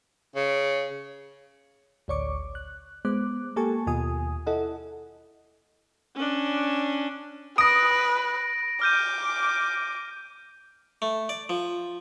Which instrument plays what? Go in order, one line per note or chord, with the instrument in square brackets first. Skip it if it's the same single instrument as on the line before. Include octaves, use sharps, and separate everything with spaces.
[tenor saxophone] C#3
[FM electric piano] A1 D2 C#5 D5 C#6 D6
F#6
G#3 B3 C5 D6 F#6
A#3 G4 A4 G#5 A5 C#6
D#2 B2 F4 G#5 D#6
E4 A4 D#5 F#5
[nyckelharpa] C#4 D4
[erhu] B4 [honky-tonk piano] D#6 [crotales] A#6 D7
[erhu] D6 [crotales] F6 G6 D#7
[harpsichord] A3
D5
F3